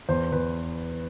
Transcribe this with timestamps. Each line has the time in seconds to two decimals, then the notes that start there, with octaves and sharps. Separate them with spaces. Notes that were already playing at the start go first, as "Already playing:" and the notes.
0.09 E2 C5
0.32 E2 B4